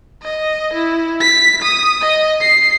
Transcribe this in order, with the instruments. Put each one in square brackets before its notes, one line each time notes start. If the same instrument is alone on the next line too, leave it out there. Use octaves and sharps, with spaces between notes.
[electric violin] D#5
E4
B6
D#6
D#5
C7